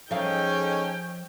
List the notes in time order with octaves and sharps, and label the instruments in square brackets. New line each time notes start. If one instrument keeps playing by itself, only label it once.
[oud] F3 F5 [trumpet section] C#4 D#4 [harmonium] G#4 A4 D#5 [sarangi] G5